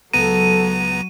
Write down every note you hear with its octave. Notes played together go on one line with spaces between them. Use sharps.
C#2 F#3 B3 A4 A#5 D#7